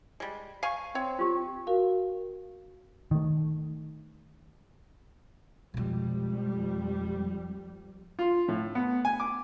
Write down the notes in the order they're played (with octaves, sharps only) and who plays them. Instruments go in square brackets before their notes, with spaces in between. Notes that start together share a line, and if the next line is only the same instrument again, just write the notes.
[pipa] G3 G#3
F5 G#5 C#6
[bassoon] C4 [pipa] C#5
[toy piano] F4 G4
[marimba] F#4 A#4 F5
[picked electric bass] D#3 A3
[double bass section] F2 G3 [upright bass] B2 G#3
[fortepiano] F4
A2
B3
G#5
D6